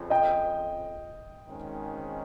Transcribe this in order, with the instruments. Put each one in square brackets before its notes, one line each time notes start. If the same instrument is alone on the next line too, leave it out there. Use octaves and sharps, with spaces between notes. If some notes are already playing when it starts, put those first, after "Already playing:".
Already playing: [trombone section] F2 C#3 F3
[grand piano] D#5 G5
[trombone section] G#1 G#2 D#3 G#3 C#4